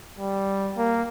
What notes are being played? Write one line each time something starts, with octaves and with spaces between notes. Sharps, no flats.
G3
A#3